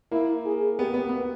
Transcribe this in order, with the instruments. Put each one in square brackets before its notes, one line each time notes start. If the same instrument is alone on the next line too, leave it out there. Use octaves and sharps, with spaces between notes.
[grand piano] A#3 [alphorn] E4
[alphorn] G#4
[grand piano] B3 [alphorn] G4
[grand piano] B3
B3